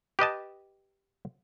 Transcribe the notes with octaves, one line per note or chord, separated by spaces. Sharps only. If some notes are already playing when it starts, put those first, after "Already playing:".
G4 B4 D#5 A5